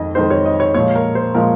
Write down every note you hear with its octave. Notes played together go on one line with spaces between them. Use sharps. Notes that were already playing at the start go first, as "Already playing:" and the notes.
Already playing: F2 D#3 G#3 D#5
F2 D#3 G#3 C5
C#5
D#5
C#5
A#2 F3 G#3 C#5
A#4
C5
A#2 F3 G#3 A#4